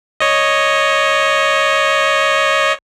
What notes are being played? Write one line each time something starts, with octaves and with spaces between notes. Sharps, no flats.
C#5 D#5